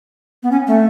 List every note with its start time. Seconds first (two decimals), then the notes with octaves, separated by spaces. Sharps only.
0.43 B3
0.51 C#4
0.67 A3